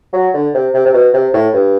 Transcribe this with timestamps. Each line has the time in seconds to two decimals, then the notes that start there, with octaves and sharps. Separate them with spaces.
0.13 F#3
0.34 D3
0.54 C3
0.74 C3
0.86 C3
0.94 B2
1.14 C3
1.34 A2
1.54 G2